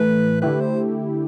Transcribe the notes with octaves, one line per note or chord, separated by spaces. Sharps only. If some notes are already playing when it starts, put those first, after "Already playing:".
Already playing: A2 E3 A3 B4
D3 A3 E4 G4 B4
C5